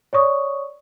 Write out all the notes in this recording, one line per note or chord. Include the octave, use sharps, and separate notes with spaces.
C#5 D5 C#6 D#6